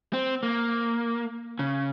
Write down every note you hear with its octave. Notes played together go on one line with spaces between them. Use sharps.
C4
A#3
C#3